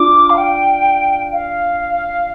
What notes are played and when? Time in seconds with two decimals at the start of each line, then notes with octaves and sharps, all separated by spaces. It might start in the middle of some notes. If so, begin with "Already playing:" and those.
Already playing: D4 F4 D6
0.30 F5
0.38 G5
1.32 F5